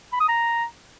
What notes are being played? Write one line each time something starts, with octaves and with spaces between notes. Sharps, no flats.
B5
D#6
A#5